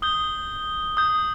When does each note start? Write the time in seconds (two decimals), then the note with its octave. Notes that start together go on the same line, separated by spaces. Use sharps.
0.02 D#6 G6 G7
0.97 D#6 G6